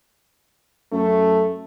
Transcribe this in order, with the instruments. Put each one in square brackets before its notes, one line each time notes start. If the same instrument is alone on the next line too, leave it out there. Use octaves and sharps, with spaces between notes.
[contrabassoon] F#2 [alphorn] A3